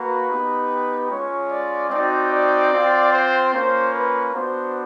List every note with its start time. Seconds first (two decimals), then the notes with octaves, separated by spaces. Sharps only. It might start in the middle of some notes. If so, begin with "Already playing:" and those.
Already playing: A#3 F#4 B4
0.29 B3 D#4 G4
1.10 G#3 C#4 F4 C#5
1.50 D5
1.90 C4 D#4 F#4 D5
2.32 D5
2.72 C4 F4
3.13 C5
3.53 A#3 C#4 F4 C5
3.94 B4
4.34 B3 D4 F#4 C5